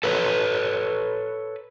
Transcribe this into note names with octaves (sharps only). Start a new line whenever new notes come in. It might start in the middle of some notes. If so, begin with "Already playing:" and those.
A4 B4 C#5